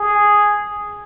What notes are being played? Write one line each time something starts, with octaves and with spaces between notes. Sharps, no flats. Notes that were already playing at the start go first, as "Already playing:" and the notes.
Already playing: G#4